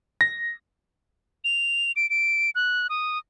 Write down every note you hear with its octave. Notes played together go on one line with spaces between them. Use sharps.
A#6
F7
D7
D7
F#6
D#6